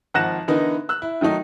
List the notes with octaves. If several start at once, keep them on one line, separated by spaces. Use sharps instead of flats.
G#1 F3 F#5 F#6 A#6 E7
D3 E3 B3 D#4 A#4
E6 F#6
E4
D#3 F#3 A3 D#4